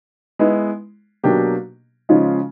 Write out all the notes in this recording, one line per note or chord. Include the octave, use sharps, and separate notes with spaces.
G#3 B3 E4
B2 F#3 A#3 D4 G4
C#3 F3 G#3 C#4 F4